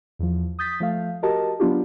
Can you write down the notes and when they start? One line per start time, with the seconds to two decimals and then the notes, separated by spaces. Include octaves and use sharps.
0.19 E2 F3
0.59 D#6 G6 A6 B6
0.80 F3 A3 F5
1.23 F#4 G4 A#4 D#5 A5
1.60 F#3 B3 D4 F4 G4